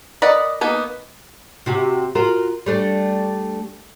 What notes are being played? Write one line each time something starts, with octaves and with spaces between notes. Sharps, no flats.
A#4 D5 D#5 F#5 B5
A#3 B3 D#4
C3 F#4 G4
F4 F#4 A#4
G3 A3 D4